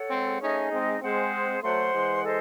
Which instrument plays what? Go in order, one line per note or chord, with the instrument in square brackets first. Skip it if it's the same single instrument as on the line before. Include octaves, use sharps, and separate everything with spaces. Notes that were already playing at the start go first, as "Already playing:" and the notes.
Already playing: [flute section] A4 C#5 F#5
[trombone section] G#3 C4
[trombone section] A3 C#4 [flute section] D#4 G#4 D#5
[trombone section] G#3 C4
[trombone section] G#3 C4 [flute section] G#4 C5 F#5
[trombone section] F#3 A3 [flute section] C5 F#5 C6
[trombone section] E3 G#3
[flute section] A4 C5 D#5